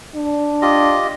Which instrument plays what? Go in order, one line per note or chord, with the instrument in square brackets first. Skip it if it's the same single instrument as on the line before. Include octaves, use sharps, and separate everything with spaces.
[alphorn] D4
[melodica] F4 G4 D#5